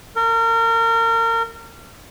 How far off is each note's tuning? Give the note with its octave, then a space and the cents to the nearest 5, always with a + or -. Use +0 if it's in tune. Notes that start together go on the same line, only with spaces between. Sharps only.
A#4 -30